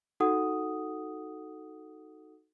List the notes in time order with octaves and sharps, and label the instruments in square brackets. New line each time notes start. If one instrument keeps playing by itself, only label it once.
[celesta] D#4 F#4 A4 F#5 D#6